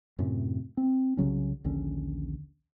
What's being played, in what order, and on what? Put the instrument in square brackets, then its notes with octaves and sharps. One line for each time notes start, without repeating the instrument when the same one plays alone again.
[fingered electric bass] F#2 A2 C3
C4
C2 C#3 F#3 C#4
A#1 D#2 D3 C#4